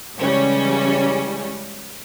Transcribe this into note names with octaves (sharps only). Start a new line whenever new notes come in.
C#3 E3 G3 G#3 C#4